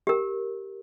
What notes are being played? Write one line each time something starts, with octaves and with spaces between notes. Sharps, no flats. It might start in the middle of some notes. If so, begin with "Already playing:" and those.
G4 A#4